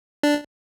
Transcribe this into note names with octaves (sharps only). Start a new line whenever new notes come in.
D4